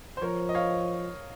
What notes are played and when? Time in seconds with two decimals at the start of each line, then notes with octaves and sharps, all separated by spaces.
0.17 C5
0.22 F3 A#4 C#5
0.49 D#5
0.55 C#5 F5